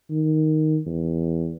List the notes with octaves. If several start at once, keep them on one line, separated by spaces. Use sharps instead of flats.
D#3
E2